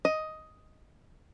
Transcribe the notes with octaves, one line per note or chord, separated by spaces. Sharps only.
D#5